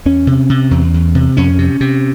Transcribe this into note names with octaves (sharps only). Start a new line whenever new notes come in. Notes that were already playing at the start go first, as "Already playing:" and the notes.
E2 C#4
C3
C3
E2
E2
C3
F2 C#4
C3
C3